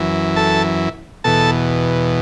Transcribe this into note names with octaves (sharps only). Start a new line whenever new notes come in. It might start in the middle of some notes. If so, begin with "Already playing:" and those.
Already playing: F#2 E3
A4 A5
E2 B2 A4 A5